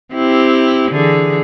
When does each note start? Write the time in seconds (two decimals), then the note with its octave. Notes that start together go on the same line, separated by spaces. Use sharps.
0.14 C4 E4 G4
0.91 D3 E3 G#4